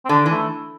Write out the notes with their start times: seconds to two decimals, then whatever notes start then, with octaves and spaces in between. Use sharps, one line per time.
0.05 C4
0.09 D3 D4
0.26 E3
0.31 A3